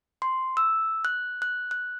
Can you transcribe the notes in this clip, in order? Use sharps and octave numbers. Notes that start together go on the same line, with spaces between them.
C6
E6
F#6
F#6
F#6